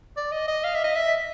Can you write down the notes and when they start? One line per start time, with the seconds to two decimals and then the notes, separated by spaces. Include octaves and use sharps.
0.17 D5
0.31 D#5
0.48 D#5
0.64 F5
0.74 E5
0.84 D#5
0.95 E5